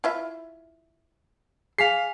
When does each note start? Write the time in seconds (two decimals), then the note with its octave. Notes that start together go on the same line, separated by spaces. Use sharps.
0.04 E4 F4 E5
1.79 G#4 F5 G#5 B6 C7 F7